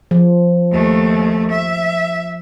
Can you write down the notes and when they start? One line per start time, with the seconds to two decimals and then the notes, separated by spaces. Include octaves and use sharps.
0.11 F3
0.73 D#2 A3
1.51 E5